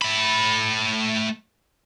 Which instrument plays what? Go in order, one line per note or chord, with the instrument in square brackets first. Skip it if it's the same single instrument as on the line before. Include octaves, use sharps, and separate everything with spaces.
[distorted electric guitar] A3 B5